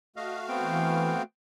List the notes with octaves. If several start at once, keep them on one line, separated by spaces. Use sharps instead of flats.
A3 F#4 D#5 F5
B3 C4 G5
E3